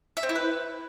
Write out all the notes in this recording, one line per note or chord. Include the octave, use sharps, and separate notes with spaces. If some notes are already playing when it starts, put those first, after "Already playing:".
E5
C4
E4
B4